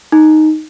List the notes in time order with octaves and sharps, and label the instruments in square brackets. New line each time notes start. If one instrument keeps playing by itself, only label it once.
[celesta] D#4